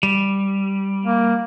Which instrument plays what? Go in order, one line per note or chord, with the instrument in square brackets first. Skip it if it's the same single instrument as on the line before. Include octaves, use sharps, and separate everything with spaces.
[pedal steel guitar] G3
[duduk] A#3